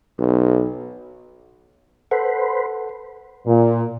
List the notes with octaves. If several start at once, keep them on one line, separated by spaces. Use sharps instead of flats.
B1
A4 B4 C5 F#5
A#2